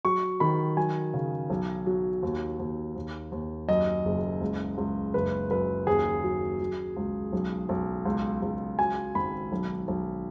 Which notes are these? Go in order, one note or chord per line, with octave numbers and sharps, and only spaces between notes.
F#3 C#6
D#3 B5
F#3 G#5
C#3
B1
F#3
D#2
D#2
D#2
D#2
F#2 D#5
F#1
C#2
C#2
F#1 B4
F#2 B4
D#2 G#4
F#3
F#3
C#2
B1
B1
C#2
C#2
F#3 G#5
G#1 B5
B1
B1